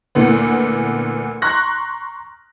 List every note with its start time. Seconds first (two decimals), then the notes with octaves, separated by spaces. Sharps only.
0.15 D2 A#2 E3 B3
1.42 A#5 C6 C#6 F#6 A#6